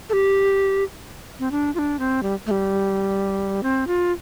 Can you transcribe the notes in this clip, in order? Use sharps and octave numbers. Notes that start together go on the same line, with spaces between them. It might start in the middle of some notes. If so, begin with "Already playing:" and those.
A4
G4
C4
D4
F4
D4
C4
G3
A3
G3
C4
F4